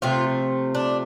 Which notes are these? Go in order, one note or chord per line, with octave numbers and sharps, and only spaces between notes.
C3 F3 A3 F4
D4